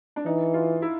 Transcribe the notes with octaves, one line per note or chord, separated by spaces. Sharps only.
D4
E3 D#4
F4
E4